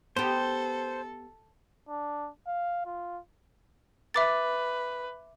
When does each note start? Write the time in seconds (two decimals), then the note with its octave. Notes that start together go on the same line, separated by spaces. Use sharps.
0.17 B3 G4 A4 C5
1.89 D4
2.47 F5
2.86 F4
4.14 B4 E5 D6 A6